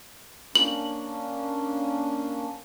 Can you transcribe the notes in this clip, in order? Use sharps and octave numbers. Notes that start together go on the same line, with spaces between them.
A#3 C#4 D4 F#7